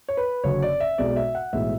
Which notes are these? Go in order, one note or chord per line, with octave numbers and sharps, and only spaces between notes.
C#5
B4
F#1 F#2 D3 F#3 C#5
D5
E5
B1 B2 G#3 D5
E5
F#5
B1 A2 E3 G#3 E5